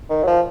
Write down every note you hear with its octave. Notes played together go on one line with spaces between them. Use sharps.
D#3
F#3
F3